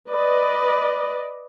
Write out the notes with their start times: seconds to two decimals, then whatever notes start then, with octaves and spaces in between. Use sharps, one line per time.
0.10 B4 D5 D#5